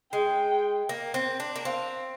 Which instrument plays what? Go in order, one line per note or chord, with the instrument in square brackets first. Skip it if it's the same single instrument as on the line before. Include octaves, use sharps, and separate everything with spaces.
[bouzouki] G#3 [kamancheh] G5
[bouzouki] A#3
C4
D4
A#3
[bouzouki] C4 [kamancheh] F5